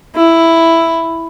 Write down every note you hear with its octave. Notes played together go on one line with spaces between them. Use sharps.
E4